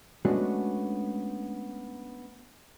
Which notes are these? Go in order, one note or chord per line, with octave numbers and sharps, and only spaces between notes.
G#3 A3 B3 C#4 D4 F#4